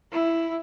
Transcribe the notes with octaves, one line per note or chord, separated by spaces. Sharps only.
E4